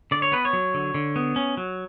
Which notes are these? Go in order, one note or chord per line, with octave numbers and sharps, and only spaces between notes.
D3 D5
C#5
B3 B4
C#5
F#3
D3
D3
B3
C#4
F#3